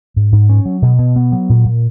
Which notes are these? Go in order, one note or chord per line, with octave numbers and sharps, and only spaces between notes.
G#2
G#2
C#4
F#3
B2
B2
B3
F#3
A#2
A#2